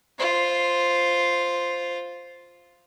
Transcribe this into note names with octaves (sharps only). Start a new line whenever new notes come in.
F4 C5